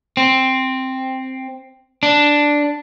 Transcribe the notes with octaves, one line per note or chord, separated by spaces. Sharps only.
C4
D4